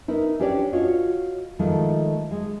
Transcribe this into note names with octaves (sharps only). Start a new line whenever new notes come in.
D#4 E4 A#4 B4
C#4 D4 G4 B4 C#5 D5
F4 F#4 C#5 D#5
D#3 F3 G#3 A3 E4
G#3